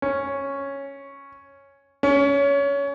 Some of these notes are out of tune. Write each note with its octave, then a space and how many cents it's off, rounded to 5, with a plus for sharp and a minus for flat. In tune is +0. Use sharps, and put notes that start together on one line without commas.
C#4 -5
C#4 +20